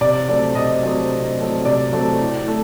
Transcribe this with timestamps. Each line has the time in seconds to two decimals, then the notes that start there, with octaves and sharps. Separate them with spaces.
0.01 C3 D5
0.28 F#3 A3 C4 D5
0.55 C3 D#5
0.83 F#3 A3 C4
1.10 C3
1.38 F#3 A3 C4
1.65 C3 D5
1.93 F#3 A3 C4
2.20 A2
2.48 A3